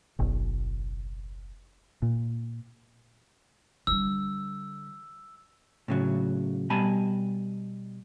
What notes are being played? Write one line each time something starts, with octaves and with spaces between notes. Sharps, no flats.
F#1 B1
A#2
D3 G3 E6
A2 C#3 F#3
B2 G3 G#5 A5 B5